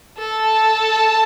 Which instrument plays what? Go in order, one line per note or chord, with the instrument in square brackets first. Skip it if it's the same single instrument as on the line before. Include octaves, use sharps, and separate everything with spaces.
[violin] A4 [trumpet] A5